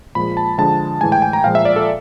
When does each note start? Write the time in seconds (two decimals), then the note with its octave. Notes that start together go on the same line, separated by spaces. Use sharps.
0.15 A#2 F3 G#3 B5
0.37 A5
0.58 D3 F3 G#3 A5
1.01 A2 E3 G#3 G#5
1.12 G5
1.22 G#5
1.33 A#5
1.44 A#2 F3 G#3 F5
1.55 E5
1.65 D5
1.76 A4